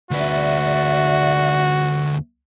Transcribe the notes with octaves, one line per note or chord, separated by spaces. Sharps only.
D2 F#4 B4 D5 E5